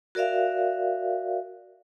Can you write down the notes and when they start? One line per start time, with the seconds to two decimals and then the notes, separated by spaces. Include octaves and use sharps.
0.15 F#4 A#4 D5 E5 F5